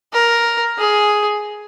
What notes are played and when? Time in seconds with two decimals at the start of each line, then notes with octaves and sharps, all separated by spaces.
0.13 A#4
0.78 G#4